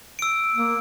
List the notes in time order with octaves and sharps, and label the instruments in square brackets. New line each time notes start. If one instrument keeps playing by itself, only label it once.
[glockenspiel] E6 D7
[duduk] A#3